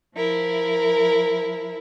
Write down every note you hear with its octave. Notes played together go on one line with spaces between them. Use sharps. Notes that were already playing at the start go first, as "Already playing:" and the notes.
F3 E4 A#4